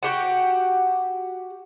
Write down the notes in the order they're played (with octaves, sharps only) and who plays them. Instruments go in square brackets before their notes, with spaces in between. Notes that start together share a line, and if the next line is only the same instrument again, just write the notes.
[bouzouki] F#4 G4 F#5